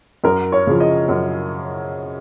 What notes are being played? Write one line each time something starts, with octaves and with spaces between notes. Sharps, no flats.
F#2 A#4
C#5
C#3 F3
D#5
F#2